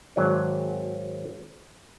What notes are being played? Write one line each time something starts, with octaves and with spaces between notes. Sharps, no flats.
G#1 F#3 D5